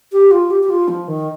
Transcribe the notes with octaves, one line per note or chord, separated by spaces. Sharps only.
G4
F4
G4
G4
F4
F3
D#3